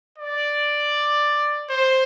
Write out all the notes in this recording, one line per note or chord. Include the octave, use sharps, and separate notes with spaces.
D5
C5